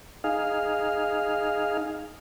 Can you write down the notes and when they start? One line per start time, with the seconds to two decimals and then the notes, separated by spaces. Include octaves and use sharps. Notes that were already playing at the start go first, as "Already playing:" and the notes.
0.24 D#4 G#4 F5